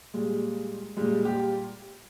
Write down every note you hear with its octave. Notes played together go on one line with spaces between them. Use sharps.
A#2 G3 G#3
A#2 G3 G#3
G4